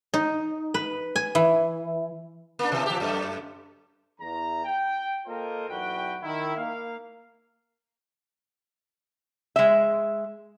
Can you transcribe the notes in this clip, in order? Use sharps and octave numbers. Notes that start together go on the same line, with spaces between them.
D#4
B4
G#5
E3
A#3 D4
B2 E3
F3 G4
F#2 A3
E2 A#5
G5
A#3 F4 A4 A#4 C5 D#5
B1 E2 F#4 B4 G5
D#3 E4
A#3 F5
G#3 E5